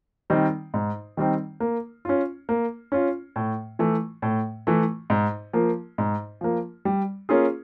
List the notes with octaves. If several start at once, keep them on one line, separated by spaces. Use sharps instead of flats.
D#3 G3 C4 D#4
G#2
D#3 G3 C4 D#4
A#3
C#4 F4
A#3
C#4 F4
A2
E3 A3
A2
E3 A3
G#2
F3 A#3
G#2
F3 A#3
G3
A#3 C#4 F4 G#4